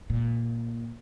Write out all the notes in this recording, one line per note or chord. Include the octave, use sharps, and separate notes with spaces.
A#2